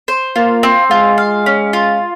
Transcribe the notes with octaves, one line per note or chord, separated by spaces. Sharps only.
C5
A#3 F4
C4
G#3 F4
F5
C#4
F4